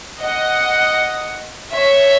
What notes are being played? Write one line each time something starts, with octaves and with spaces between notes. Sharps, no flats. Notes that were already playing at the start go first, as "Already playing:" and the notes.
D#5 F#5
C#5 E5